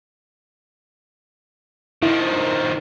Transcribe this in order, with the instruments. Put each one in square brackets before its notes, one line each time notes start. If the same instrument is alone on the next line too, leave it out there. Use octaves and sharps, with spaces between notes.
[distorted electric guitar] D#3 F3 [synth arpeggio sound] E4